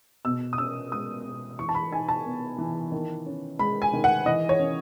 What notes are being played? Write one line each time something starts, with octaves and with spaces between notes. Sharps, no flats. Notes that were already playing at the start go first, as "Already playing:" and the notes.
B2 E6
D#6
C#4 E6
G#3 D#6
B2
E3 C#6
A5
B5
D#4 G#5
A5
B3
E3
D#3
C#4
G#3 B5
G#5
D#3
F#5
E3 D#5
C#5
C#4